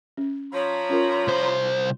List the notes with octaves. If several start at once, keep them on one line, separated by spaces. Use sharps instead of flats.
C#4
F3 C#5 A#5 B5
C#4 F4 A#4
C2 C5